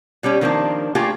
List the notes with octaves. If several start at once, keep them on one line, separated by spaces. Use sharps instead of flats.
B2 G3 C#4 G4
D#3 F3 A#3 C4 D4
A3 A#3 F4 G4 G#4